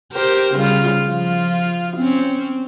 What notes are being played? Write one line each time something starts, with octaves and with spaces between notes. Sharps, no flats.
G4 A#4 C5
C#3 G3 F4
F3 F4
C4 C#4